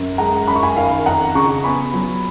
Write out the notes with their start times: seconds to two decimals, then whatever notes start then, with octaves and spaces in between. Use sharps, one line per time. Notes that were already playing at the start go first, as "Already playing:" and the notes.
Already playing: F#2
0.18 G#3 F#5 A#5
0.48 F#2 B5
0.56 C#6
0.63 G#5 B5
0.77 D#3 F5 G#5
1.06 F2 F#5 A#5
1.35 C#3 A#5 C#6
1.64 B3 G#5 B5
1.94 F#3